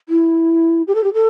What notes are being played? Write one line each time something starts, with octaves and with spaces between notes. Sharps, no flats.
E4
G4
A4
G4
A4